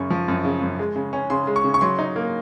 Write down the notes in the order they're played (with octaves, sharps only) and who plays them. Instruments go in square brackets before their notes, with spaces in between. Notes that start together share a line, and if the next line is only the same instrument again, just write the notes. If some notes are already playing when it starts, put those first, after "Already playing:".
Already playing: [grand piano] F#2 C#3 C#6
F3
F#2
C#3
F#2
G#3
C#3
C#4
C#3 C6
G#3
C#6
C#3
C#6
F#3 C6
D#4
A#3